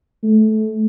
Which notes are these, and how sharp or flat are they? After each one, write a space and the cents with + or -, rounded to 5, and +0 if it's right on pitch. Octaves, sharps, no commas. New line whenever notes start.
A3 -20